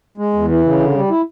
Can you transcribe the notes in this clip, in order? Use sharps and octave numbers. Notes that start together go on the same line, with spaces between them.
G#3
E2
E3
C#3
D3
G3
E4